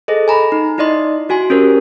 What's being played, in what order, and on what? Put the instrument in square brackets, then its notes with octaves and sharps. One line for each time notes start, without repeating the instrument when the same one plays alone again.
[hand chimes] G#4 A4 C5 D#5
G#5 A#5 B5
D#4
D#4 E4 D5 D#5 C6
E4 F#4 G#5 C6
C#4 G4 A#4 C5